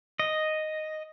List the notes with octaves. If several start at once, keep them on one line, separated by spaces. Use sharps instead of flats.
D#5